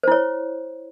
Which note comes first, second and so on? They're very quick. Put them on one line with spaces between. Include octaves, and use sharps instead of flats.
C5 E4 C#5